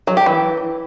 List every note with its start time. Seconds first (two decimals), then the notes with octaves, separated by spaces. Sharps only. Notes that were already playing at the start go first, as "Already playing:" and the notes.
0.07 F#3
0.17 G4
0.26 E3